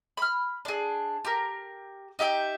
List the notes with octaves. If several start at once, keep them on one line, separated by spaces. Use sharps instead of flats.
B5 F6
D4 G#4
G4 A#4
D#4 G4 E5 G5